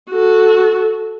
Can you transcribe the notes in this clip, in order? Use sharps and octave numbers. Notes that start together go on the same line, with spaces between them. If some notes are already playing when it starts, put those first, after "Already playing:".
F#4 A4